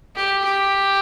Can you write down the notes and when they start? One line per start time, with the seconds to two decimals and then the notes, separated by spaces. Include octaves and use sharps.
0.15 G4
0.44 G4